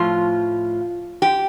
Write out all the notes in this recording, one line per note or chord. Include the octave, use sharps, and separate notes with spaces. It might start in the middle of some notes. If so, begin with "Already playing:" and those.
Already playing: A2 F3 F4
G4